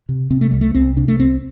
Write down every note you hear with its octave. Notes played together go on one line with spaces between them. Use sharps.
C3
C3 C4
A3
C2 G3
A3
C2 C4
C3 D4
A3
C2 C4